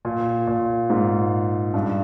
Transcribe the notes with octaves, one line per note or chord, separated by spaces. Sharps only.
A#2
A#2
G#2
G2